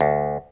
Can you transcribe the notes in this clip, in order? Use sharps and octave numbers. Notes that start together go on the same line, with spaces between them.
D2